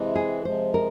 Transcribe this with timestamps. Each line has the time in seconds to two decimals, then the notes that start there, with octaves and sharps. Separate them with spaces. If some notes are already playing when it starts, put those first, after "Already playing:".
Already playing: C3 E3 G#3
0.15 G#4
0.45 C3 F3 G#3 C5
0.74 A#4